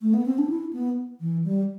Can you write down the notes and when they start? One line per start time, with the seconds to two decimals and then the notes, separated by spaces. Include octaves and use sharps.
0.01 A3
0.14 B3
0.26 C4
0.38 D4
0.50 E4
0.73 B3
1.21 E3
1.44 G3